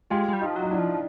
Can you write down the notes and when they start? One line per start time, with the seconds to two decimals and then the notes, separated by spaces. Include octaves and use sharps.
0.10 G#3 F4 G4
0.28 G#3
0.33 G3
0.40 D#4 F4
0.46 F3
0.56 F#3
0.62 D#4
0.71 D4 E4
0.78 F3